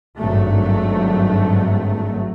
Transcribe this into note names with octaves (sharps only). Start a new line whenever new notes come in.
G#1 G2 F#3 A3